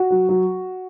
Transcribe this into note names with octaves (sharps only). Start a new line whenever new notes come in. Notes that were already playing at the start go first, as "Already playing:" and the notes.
Already playing: F#4
F#3
F#3